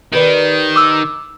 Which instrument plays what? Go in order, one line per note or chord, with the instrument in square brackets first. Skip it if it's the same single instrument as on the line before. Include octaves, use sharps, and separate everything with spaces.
[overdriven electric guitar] D#3 [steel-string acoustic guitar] G4 B4 D5
[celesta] D6 E6